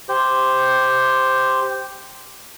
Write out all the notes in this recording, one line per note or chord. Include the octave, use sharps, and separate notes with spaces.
G4 C5